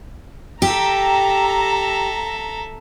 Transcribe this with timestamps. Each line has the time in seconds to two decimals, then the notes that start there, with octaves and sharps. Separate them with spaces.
0.62 G4 A4 E5 A#5